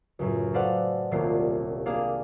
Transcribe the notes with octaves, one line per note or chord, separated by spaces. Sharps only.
C#2 F#2 A2
A4 B4 C5 D5 F5 F#5
D#1 C2 A#3 C7
A#3 D4 G#4 F5